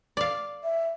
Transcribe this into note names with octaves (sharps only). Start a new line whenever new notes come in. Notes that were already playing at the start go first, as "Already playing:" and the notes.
D5 F5
E5